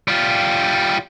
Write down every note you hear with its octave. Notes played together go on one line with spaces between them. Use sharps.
G3 F4